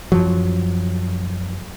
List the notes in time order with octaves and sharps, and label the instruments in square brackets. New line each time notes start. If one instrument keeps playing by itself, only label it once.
[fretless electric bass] F#2 F3 F#3